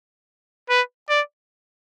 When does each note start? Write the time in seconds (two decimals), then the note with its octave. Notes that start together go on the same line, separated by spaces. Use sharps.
0.70 B4
1.09 D5